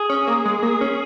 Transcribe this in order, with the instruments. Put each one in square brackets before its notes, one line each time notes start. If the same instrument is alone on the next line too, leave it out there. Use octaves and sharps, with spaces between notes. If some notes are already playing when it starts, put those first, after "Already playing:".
Already playing: [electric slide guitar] G#4
[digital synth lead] C#4
A#3
G#3
A#3
C#4